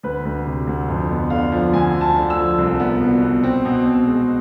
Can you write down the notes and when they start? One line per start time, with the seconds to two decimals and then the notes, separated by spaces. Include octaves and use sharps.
0.03 D2 B4
0.25 D2
0.46 C3
0.67 D2
0.88 F2
1.09 B3
1.30 D3 F5
1.52 F3
1.73 D2 G#5
1.94 D2
2.01 A5
2.16 D3
2.30 E6
2.37 F3
2.58 C2
2.80 B3
3.01 B2
3.22 B3
3.43 C4
3.65 B2
3.85 C4
4.07 G#3